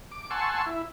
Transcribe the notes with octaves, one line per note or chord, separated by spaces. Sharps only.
D6
F#5 G#5 A5 C6 C#6 E6
E4